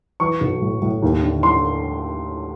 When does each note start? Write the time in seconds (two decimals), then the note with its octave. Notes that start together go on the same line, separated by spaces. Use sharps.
0.20 E3 C#6
0.41 B1
0.61 A2
0.82 A2
1.02 D#2
1.23 D3
1.43 D3 C6